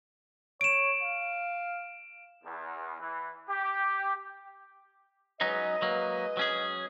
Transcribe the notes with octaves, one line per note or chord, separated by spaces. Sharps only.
C#5 D7 E7
F5
E2
E3
G4
F#3 G#3 C#4 D#4 B4 D#5
F#3 A#3
F#3 C#4 G#4